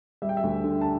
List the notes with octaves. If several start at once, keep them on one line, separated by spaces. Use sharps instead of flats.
G3 E5
G5
E5
D2
D3
A5